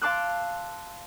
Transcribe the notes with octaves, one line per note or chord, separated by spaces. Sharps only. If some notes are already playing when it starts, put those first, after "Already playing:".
F5 A5 C6 D6 E6 F#6